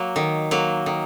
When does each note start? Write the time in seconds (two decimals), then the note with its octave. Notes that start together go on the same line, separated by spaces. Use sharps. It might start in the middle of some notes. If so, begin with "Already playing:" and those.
Already playing: F#3 A#3
0.16 D#3
0.51 F#3 A#3
0.86 D#3